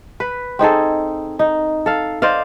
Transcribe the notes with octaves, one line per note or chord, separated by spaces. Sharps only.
B4
C4 D#4 G#4 A4
D#4
A4 F5
C5 D5 D#5 F5